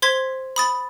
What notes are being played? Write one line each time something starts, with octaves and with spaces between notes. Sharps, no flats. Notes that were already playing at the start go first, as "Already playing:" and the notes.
C5 C6 G#6 B6
B5 D#6 A6